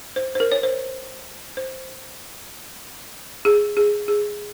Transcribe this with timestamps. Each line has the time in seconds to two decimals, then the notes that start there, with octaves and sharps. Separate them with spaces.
0.16 C5
0.35 C5
0.40 A#4
0.52 C#5
0.63 C5
1.57 C5
3.45 G#4
3.77 G#4
4.08 G#4